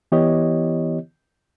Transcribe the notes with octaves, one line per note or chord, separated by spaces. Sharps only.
E3 B3 E4 G4 C#5 D#5